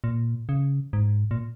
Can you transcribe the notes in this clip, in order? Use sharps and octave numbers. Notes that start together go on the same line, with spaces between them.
A#2
C#3
G#2
A#2